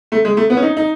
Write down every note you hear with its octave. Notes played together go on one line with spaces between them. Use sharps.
A3
G#3
A3
B3
C#4
D#4
D#4